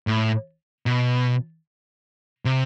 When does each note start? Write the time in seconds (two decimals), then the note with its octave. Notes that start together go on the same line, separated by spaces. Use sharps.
0.07 A2
0.86 B2
2.45 C3